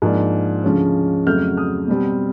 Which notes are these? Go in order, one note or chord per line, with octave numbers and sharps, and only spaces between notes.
G#2 F3 A#3 D4
D2 C#3 F3 G#3 C#4
F2 C#3 F#3 A3 F6 G6
D#6 F6
B2 G3 C4